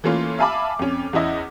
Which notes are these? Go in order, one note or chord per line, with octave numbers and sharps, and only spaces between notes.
E3 A3 A#3 C#4 F4
E5 F5 G#5 A5 B5 D6
F2 C#4
E2 C#4 E4 D#5